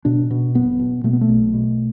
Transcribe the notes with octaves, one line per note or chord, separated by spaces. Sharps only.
B2 D4
B2
F#1 B3
B2
B2 A3
B3
A3
B1
B2